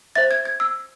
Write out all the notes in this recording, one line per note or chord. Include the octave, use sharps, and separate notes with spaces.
C5 E5 A6
G#6
G#6
E6